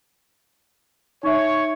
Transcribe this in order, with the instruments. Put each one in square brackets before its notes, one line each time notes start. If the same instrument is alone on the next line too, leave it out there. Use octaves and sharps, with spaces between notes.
[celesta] D#4 E5 [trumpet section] C#5